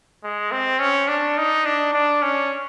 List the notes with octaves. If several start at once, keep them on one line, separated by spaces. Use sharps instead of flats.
G#3
C4
C#4
D4
D#4
D4
D4
C#4